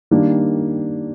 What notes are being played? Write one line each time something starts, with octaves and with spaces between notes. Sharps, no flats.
D#3 G3 A#3 D4